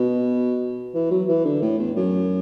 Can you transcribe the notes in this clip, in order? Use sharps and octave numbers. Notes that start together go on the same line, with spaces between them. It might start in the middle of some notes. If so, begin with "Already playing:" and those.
Already playing: B2
E3
F#3
E3
D3
A2
E2
F#2